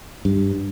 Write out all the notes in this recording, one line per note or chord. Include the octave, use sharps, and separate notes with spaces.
G2